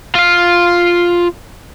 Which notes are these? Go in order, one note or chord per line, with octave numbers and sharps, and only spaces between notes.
F4 F5